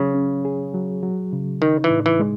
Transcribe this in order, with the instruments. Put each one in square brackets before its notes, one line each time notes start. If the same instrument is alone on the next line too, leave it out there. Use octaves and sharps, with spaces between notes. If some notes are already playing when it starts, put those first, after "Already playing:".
Already playing: [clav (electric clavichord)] C#3 [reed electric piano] F#3
[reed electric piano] C#4
G#4
F#3
F#3
C#3
[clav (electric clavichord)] D#3 [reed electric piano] D#4
[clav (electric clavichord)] E3
[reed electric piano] A2
[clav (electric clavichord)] E3
[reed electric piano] G#3